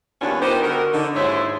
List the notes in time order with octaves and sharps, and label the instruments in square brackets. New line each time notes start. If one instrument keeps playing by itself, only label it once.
[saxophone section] D#2 G3 B3 C#4 D4 F4
B3 D#4 G4 A#4 C5
D3 D#4 F#4 A#4
D3 D#4
D#2 G#2 E4 C5 C#5